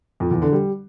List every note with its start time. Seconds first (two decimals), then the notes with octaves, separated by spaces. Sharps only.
0.20 F2
0.31 E2
0.42 D3
0.53 G3